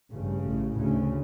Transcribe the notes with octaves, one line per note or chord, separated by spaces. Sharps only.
A1 G2 C#3
A1 A2
D2 C#3